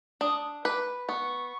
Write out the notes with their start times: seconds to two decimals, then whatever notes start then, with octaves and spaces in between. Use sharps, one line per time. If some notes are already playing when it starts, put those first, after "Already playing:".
0.21 D4 D#6
0.65 B4 D6
1.08 B3 C#6